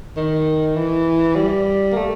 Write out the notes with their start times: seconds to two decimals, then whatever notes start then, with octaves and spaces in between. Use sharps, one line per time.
0.16 D#3
0.76 E3
1.36 G3
1.92 A#3
1.96 A3